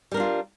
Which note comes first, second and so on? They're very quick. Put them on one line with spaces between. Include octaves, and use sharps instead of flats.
G3 A#4 D4 F4